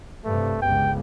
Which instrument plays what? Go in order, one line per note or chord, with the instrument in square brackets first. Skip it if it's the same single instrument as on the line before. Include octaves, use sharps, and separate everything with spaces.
[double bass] G2 C3 [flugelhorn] A3
[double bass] G1 C#2 [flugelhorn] G5